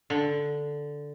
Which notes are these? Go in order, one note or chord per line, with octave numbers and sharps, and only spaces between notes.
D3